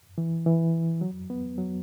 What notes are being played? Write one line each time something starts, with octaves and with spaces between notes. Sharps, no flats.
E3
E3
F#3
B3
F#3